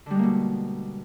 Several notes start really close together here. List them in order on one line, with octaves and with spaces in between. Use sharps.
D3 G3 G#3 A#3 B2